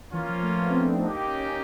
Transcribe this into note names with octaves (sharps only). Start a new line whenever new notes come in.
E3 A#3 C#4 F4
F3
A3
B3
C4
D4
D#4
A#3 D4 D#4 G4
C#4